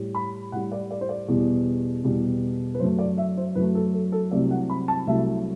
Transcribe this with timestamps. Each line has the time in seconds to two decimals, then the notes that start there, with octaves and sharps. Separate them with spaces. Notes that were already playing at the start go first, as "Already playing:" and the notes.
Already playing: A2 G3
0.15 B5
0.52 A2 G3 F#5
0.72 D5
0.91 D5
1.01 C5
1.09 D5
1.28 E2 B2 G3
2.04 E2 B2 G3
2.74 B4
2.80 F#2 F#3 A3 C5
2.98 D5
3.18 E5
3.37 C5
3.55 F#2 F#3 A3 B4
3.75 A4
3.94 A4
4.12 A4
4.31 C2 C3 F#3 A3 D5
4.51 F#5
4.70 B5
4.88 A5
5.07 C2 C3 F#3 A3 E5